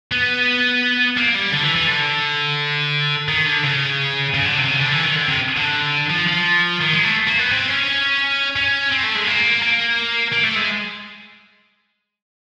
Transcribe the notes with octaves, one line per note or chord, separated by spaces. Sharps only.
B3
A#3
G3
D3
E3
E3
D3
D#3
D3
C#3
C#3
D3
C3
C#3
D3
E3
D#3
D3
C3
D3
F3
F3
D#3
G#3
A3
A#3
B3
C4
C#4
C#4
C4
A3
G#3
A#3
A#3
A#3
A3
G#3